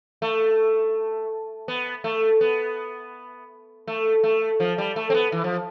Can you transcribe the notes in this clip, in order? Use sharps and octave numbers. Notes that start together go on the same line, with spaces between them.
A3
B3
A3
B3
A3
A3
F3
G3
A3
C4
B3
E3
F3